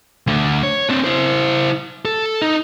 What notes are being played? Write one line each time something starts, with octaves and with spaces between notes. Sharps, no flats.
D2 D3
C#5
C4 D4
E4 C5
A4
D#4